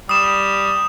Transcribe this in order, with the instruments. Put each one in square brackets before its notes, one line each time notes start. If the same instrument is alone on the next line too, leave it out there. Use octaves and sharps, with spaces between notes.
[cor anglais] G3 [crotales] D#6 E7